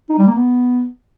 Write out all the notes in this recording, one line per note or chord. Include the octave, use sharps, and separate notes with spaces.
D#4
G3
A#3
B3